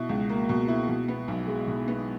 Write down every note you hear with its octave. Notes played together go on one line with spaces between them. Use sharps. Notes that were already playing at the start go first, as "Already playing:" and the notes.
Already playing: B2 E4
C#2
A#3
B2
E4
B2
B3
B1
G#3
B2
B3